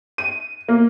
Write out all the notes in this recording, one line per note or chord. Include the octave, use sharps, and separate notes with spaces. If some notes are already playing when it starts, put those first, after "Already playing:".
D#7
A#3